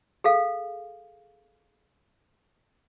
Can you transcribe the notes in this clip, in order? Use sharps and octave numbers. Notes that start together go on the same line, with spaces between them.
G#4 A4 F5